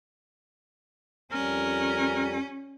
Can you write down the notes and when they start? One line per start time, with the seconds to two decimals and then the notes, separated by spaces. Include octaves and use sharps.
1.32 F2 G3 C#4 A#4 G#5